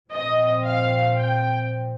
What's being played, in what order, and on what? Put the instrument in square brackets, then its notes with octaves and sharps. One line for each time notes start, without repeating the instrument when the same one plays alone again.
[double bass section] A#2 F3 C4 [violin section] D#5
[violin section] F5
G5